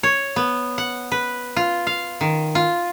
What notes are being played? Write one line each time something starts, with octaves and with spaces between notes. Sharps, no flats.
C#5
B3
F#5
B4
F4
F5
D#3
F4